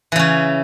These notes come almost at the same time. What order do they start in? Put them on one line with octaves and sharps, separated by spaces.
E3 C#3 C#4